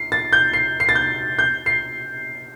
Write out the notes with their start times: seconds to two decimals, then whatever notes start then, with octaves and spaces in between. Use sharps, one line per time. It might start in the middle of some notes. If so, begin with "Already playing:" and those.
Already playing: C7
0.12 A6
0.33 G6
0.53 C7
0.80 C7
0.89 A6
0.95 G6
1.39 G6
1.66 C7